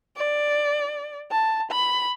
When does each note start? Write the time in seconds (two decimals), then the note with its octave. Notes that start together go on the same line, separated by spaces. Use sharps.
0.17 D5
1.31 A5
1.71 B5